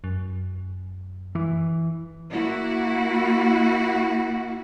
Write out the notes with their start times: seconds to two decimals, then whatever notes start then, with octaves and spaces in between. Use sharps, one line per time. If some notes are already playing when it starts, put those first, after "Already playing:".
0.04 F#2
1.35 E3
2.31 A#3 E4 F#4